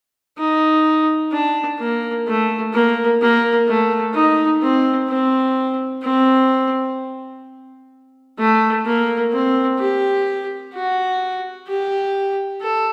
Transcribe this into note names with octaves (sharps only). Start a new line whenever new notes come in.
D#4
D4
A#3
A3
A#3
A#3
A3
D#4
C4
C4
C4
A3
A#3
C4
G4
F#4
G4
A4